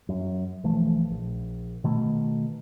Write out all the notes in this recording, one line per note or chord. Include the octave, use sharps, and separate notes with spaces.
F#2
B1 E3 F3 A3
A#1
B2 D#3 A3